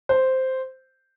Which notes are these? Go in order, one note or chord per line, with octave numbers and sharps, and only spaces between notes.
C5